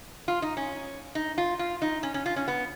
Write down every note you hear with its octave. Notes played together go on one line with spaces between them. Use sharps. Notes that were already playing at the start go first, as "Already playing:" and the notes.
F4
D#4
C#4
D#4
F4
F4
D#4
C#4
C#4
F4
C#4
B3